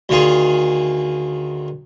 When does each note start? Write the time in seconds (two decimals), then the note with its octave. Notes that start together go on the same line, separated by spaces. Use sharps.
0.09 D2 D#3 F4 G#4